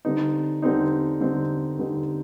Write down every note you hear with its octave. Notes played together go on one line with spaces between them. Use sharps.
D3 G3 C4 D#4
D3 G3 C4 D#4
D3 G3 C4 D#4
D3 G3 C4 D#4